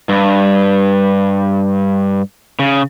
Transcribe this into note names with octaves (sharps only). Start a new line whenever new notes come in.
G2
C#3